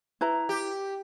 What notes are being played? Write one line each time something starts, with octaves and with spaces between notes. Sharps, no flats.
E4 B4 A#5
G4